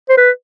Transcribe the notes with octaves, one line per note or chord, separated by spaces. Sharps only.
C5
B4